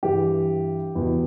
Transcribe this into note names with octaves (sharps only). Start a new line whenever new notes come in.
G2 E3 G4
E2 B2